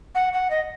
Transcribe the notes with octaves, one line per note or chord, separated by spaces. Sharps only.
F#5
F#5
D#5